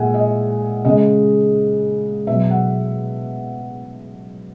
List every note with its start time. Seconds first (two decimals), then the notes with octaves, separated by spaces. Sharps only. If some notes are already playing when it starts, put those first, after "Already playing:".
Already playing: A#2 G#3 E5 F#5 G#5
0.14 D#5
0.85 C#3 G#3 D#5
2.27 B2 F#3 E5
2.51 F#5